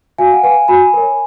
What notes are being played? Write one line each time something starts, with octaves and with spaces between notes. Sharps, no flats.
F#4 F5 G#5
F#5
B4 F5 G#5
F#4 G#5 B5
A#4 C#5